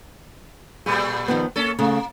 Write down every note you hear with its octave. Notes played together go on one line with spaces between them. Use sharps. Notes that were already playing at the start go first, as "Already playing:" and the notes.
A#2 G3 A3 G#4
D#3 F3 B3
A#3 C#4 A4
C#3 A3 A#3